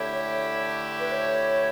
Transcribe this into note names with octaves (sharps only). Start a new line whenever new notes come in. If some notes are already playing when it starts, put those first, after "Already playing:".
Already playing: D3 A3 E4 G4 C#5
B4
C#5